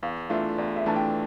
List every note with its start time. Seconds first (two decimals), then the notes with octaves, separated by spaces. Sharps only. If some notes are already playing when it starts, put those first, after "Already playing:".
0.03 E2 F5
0.30 E3 A3 D4 F4 E5
0.58 E2 D5
0.76 E5
0.86 E3 A3 D4 F4 A5
0.96 G5